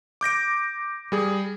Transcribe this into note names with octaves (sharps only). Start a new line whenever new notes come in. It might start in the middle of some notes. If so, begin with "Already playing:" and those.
D6 G6 A#6 D7
G3 G#4